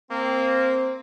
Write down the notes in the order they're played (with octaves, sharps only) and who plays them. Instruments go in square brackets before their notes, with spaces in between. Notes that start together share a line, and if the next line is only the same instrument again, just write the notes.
[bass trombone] A#3 [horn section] C4